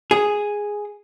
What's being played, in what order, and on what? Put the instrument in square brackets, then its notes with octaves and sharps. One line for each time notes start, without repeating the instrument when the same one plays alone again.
[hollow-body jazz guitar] G#4